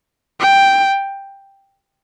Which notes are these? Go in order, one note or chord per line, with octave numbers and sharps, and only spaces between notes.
G5